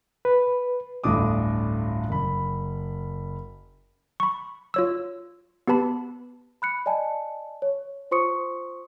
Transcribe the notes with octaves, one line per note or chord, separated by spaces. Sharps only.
B4
G1 D2 A2 D4 D6 D#6
F#1 B5
B5 C#6
F4 C#5 E6
B3 G4 B4 A5 B5
B5 F#6 C#7
D5 D#5 G#5 A5
C#5
F4 C5 C6 C#6 D#6 C#7